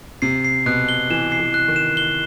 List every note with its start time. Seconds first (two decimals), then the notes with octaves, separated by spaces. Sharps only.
0.22 C3 C7
0.45 C7
0.66 B2 F#6
0.89 G7
1.10 E3 E7
1.32 C7
1.40 E3
1.54 F#6
1.68 D#3
1.76 E7
1.97 G7